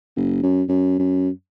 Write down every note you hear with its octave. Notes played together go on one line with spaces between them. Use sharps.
F#1
F#2
F#2
F#2